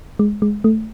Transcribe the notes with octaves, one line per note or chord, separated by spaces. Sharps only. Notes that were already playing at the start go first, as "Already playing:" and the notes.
G#3
G#3
A3